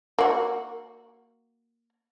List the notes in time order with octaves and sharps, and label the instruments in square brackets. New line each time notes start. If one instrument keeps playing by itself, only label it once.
[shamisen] A#3 F#4